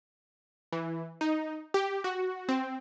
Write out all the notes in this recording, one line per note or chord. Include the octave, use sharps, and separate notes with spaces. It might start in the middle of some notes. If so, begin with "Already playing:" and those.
E3
D#4
G4
F#4
C4